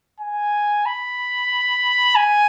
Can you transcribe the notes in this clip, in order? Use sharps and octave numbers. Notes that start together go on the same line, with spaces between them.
G#5
B5
G#5